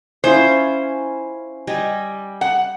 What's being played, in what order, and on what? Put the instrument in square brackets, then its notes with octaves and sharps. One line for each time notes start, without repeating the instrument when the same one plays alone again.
[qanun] C#4 E4 F4 [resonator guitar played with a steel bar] C5
[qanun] G3 D#5 G#5
[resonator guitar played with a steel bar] F#5